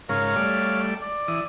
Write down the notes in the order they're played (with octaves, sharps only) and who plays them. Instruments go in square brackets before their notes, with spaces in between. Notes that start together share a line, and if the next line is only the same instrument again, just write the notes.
[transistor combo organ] G#2 C#3 A#4 [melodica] C#5 F5
[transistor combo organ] G3 A3 D5
[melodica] D5
[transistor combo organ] E3 D#6